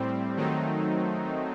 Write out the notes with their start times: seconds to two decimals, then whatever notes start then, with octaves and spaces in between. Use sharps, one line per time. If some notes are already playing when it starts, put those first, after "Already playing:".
Already playing: A2 G3 C4
0.36 D#3 F#3 A3 C4 D#4